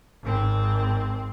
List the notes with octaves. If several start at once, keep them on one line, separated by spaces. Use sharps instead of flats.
G#1 C4